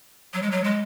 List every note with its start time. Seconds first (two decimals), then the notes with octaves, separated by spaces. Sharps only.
0.34 F#3
0.42 G#3
0.51 F#3
0.64 G#3